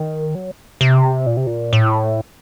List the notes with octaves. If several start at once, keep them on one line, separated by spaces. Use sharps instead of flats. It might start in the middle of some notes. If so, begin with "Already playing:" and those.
Already playing: D#3
F#3
C3
A#2
C3
A#2
A2